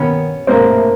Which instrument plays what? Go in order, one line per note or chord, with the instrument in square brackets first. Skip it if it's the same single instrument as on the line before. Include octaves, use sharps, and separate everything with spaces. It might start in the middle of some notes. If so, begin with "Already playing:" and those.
Already playing: [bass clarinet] D#3 [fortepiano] B3 C#4
[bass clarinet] G#3 [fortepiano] A#3 C4
[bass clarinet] G#3
A3